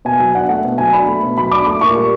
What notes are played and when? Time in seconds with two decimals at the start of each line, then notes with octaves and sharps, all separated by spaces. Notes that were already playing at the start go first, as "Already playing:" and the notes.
0.05 B2 G#5
0.20 F#3 G#5
0.35 D4 F#5
0.49 A3 F#5
0.65 B2
0.78 F#3 G#5
0.93 D4 B5
1.08 A3
1.23 B2
1.37 F#3 B5
1.51 D4 D6
1.67 A3 D6
1.81 A#2 C#6
1.96 G3